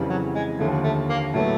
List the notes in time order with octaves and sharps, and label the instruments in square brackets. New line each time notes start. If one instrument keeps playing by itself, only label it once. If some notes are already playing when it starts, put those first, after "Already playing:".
Already playing: [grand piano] F2 C#3 E3 G3
[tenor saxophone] F#3
G#3
[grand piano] D#2 D3 F3 [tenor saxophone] A3
[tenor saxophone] A3
A#3
[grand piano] A2 F#3 B3 [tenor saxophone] A3